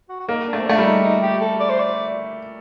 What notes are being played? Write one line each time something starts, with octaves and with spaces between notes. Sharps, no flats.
F#4
F#4
A#3 D#4
D4
A3
C4
A3 D4
G3
D#4
D#4
G4
A4
D5
C5
D5